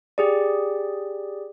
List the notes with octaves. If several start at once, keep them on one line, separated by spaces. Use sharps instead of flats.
G4 G#4 D5